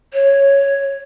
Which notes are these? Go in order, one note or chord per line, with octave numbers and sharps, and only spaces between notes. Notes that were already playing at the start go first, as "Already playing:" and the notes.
C#5